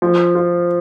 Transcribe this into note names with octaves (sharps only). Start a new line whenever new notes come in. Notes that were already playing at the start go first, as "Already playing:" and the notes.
F3
F4